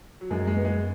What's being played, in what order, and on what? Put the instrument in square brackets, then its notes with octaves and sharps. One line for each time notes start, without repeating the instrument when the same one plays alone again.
[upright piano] F#3
[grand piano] F#2 [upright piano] G#3
[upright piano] G#3
[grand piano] B3
[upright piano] G#3